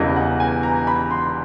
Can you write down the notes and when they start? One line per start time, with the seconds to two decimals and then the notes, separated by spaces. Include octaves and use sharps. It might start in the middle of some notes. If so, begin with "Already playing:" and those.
Already playing: E1 E2 C#3 E3 G3 D#5
0.16 F#5
0.40 G#5
0.63 A#5
0.87 B5
1.11 C6